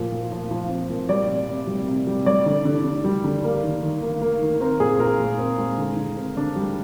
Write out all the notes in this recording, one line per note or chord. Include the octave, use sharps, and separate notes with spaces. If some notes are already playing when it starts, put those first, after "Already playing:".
Already playing: A#2 F3
A#2
F3
F3
C4
A#2
G3 D5
C3
C3
G3
C3
G3
G3 D5
D3
D3
D3
G3
D3
A#3
D#3
D#3
A#3
A#3
D#3
C4 A#4
A#2 G#4
A#2 A#4
A#2
C4
G#3
D3
D3
C4
D3 D4
G3